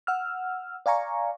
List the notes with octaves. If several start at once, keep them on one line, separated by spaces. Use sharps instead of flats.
F#5 E6 F6
D5 F5 G#5 A#5 C#6